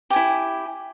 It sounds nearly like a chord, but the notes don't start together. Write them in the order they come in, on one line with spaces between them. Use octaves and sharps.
G4 G#5 E4